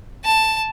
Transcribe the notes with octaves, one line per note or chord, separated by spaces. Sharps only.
A5